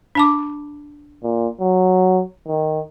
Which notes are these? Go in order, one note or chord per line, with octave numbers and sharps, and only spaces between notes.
D4 A5 D6
A#2
F#3
D#3